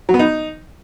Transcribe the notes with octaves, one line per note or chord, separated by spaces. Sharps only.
F#3
B3
D#4